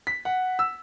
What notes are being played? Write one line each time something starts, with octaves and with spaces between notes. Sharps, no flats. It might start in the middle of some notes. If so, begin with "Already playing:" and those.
B6
F#5
E6